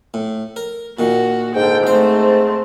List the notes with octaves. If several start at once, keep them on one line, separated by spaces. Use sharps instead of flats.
A2
A#4
A#2 D#3 F#4
G#2 D3 G5
A3 C4 C5